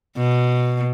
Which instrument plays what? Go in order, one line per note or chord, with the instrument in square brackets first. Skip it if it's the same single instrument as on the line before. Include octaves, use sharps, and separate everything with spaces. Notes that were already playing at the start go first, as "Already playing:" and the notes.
[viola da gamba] B2